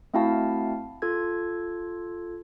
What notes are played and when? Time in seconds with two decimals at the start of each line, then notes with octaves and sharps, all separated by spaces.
0.14 A3 C4 E4 F#4 F5 A5
1.02 F4 A4 G#6